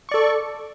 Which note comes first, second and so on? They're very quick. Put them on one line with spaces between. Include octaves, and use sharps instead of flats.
C#6 D5 A4